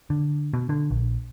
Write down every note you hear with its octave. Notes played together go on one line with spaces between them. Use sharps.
D3
B2
D3
A#1